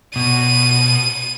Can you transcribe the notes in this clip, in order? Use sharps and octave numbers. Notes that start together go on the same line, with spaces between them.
B2 D#7